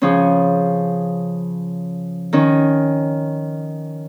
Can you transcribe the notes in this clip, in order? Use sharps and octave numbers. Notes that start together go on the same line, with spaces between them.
C#3 F3 C#4
D#3 C#4